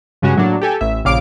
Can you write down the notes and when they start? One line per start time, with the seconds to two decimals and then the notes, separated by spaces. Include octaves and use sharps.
0.22 G2 C#3 G#3 C#4 F#4
0.37 A2 F#3 A#3 D4
0.61 G4 A4 G#5
0.81 A1 E5
1.05 A#1 C#3 F5 D6 D7